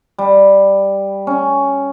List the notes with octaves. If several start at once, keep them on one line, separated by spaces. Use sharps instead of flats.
G3
C#4